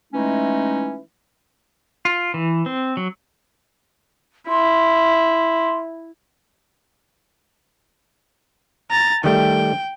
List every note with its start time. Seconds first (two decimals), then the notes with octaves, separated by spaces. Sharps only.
0.13 E3 G#3 A3 C#4 D#4
2.05 F4
2.34 E3
2.66 C4
2.97 F#3
4.49 E4 C6
8.91 A#5 A6
9.24 D#3 G3 A3 G5